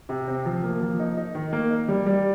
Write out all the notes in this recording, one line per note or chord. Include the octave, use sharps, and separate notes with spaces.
C3
C4
F3
A#3
F3
D#4
D#4
D#3
A#3
D#4
G3
G3